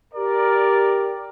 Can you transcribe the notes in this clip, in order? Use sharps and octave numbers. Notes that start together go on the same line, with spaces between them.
G4 A#4 D5